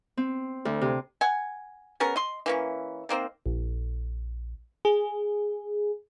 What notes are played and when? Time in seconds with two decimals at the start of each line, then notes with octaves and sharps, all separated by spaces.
0.17 C4
0.65 D2
0.81 C3
1.21 F#5 G#5
2.00 B3 C#4 G#4 A#4
2.16 D#5 C6
2.46 E3 A#3 C#4
3.09 D#3 A#3 C4
3.46 A#1
4.85 G#4